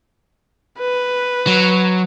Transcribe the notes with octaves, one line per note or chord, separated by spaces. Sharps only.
B4
F#3